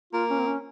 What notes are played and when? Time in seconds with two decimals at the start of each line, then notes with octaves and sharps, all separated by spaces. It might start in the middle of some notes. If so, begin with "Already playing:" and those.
0.13 A#3 F4
0.30 C#4
0.38 C4
0.46 C#4